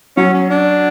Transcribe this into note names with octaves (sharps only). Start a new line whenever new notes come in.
F#3 C#4
C#4
D4